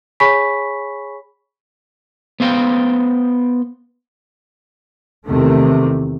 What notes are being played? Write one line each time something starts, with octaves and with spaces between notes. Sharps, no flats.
G#4 C#5 G#5 B5 C#6 B6
B3 C5 F5 G5
E2 C3 D#3 A3